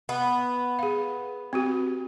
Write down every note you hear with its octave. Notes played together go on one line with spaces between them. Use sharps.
B3
G#4 F5
C4 F#4 G4